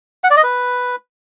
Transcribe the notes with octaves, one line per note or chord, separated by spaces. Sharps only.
F#5
D5
D#5
B4